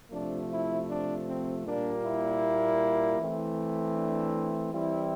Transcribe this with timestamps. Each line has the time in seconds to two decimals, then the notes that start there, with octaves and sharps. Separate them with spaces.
0.11 C3 F3 A3 D4
0.50 E4
0.89 D4
1.26 C4
1.64 A#2 G3 A#3 D4
2.04 E4
3.18 E3 A3 C4
3.96 D4
4.73 E3 G3 C4 E4